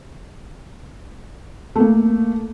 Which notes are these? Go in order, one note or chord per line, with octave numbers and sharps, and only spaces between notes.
A3 A#3